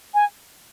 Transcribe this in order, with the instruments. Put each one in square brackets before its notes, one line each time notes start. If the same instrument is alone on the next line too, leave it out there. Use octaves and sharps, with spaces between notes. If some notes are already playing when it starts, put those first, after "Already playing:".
[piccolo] G#5